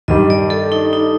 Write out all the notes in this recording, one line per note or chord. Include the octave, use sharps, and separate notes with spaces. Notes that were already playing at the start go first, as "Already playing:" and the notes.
G2 D#3 G3 D#5
D5
A4
D#4
D#4